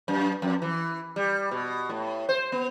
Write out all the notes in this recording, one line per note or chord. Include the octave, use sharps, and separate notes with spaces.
F#2
F2
E3
G3
B2
A2
C5
B3